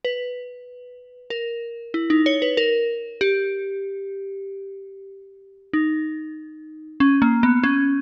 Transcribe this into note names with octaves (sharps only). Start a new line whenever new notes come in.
B4
A#4
E4
D#4
C#5
B4
A#4
G4
D#4
C#4
A#3
B3
C#4